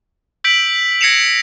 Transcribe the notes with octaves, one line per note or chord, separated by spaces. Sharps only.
E6 G6 B6 D7 F#7
G#6 A#6 C7 C#7 E7 F7